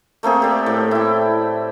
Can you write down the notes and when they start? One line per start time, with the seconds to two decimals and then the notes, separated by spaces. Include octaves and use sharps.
0.23 A3 A#3 C4 G#4
0.42 G4 D5
0.66 A2
0.91 E4 G5